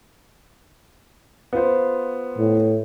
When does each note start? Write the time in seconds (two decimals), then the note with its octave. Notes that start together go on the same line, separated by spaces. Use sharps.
1.53 B3 F4 C5
2.38 A2